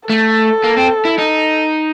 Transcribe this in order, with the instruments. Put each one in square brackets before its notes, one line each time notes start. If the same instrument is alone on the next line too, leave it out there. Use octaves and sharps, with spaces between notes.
[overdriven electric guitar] A3 [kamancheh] A4
[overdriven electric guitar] A#3
C4
E4
D#4